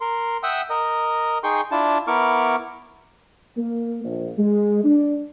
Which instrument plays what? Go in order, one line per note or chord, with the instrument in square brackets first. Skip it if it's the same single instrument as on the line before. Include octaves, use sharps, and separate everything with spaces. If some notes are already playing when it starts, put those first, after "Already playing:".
[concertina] A#4 C6
E5 F#5 G5 D#6 E6
A#4 D#5
D#4 G#4 G5 C6 C#6
D4 E4 F4 A5
B3 E4 A#4 C#6 D6 F6
[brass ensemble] A#3
A#1
G#3
D4